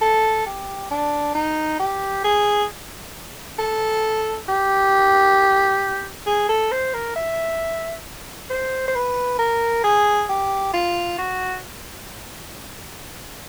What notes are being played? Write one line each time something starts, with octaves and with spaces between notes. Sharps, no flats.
A4
G4
D4
D#4
G4
G#4
A4
G4
G#4
A4
C5
A#4
E5
C5
C5
B4
A#4
G#4
G4
F4
F#4